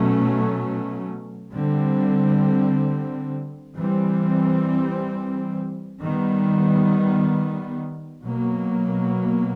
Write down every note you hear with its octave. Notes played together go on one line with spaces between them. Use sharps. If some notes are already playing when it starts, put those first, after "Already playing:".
Already playing: B2 F#3 A3 C#4
D3 G3 C4
E3 G3 C4
D#3 G3 B3
B2 F#3 A#3